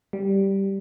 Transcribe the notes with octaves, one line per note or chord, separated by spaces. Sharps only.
G3